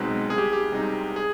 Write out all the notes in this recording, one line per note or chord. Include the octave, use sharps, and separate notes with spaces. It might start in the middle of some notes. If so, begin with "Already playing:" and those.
Already playing: B1 B2 G#3 C4 D#4 B4
C2 G#4
G4
G4
C3 G3 C4 D#4
G#4